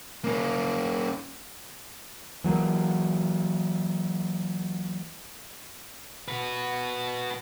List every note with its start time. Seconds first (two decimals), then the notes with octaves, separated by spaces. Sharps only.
0.24 A#3 C#4
2.44 E3 F#3 A#3
6.28 F#4 B4